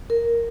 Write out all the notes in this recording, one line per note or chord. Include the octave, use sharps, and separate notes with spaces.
A#4